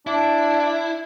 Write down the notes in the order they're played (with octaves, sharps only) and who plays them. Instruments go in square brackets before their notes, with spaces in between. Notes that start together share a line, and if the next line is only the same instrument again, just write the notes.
[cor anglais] D4 [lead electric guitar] E4